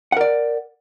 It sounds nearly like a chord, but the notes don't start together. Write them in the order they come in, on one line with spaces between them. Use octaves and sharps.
F#5 A#4 D5